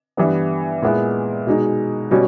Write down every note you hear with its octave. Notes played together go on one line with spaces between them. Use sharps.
G2 E3 G3 B3
A#2 G#3 B3 E4
B2 G#3 D#4
B2 G3 C#4